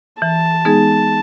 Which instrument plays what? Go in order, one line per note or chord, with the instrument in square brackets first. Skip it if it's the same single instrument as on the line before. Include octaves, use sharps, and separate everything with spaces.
[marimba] E3 [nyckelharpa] A5
[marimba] G#3 B3 D#4 G#4